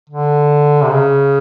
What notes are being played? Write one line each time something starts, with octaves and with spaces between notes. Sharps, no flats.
D3
C3
C#3